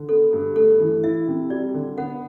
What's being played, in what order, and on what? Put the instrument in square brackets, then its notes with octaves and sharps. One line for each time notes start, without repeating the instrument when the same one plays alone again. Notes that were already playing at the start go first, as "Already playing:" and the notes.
Already playing: [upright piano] D3
[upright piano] B3 [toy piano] A4
[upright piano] G2
[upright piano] A3 [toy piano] A4
[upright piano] E3
[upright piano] E4 [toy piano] E5
[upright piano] C3
[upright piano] G3 [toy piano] D5
[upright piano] D3
[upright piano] B3 [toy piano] F#5